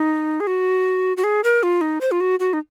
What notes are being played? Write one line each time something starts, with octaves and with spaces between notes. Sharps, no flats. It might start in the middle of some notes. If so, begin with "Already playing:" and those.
Already playing: D#4
G#4
F#4
F#4
G#4
A#4
F4
D#4
C5
F4
F#4
F#4
D#4